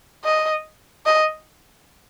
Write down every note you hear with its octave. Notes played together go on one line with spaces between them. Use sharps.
D#5
D#5